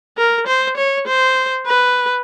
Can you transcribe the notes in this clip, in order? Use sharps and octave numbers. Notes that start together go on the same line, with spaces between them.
A#4
C5
C#5
C5
B4